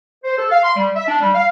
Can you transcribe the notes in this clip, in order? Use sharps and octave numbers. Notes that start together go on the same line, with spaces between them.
C5
A4
F5
C6
G3
E5
D4
G3
F5